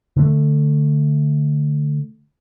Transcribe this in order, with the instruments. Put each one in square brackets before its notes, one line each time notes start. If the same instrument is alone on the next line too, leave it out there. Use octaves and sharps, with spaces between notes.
[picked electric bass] D3 A3